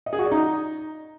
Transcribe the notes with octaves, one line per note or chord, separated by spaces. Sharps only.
D#5
G#4
F#4
D5
D#4